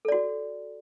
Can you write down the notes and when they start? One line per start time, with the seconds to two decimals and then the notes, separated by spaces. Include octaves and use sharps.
0.05 A4
0.08 D5
0.12 F#4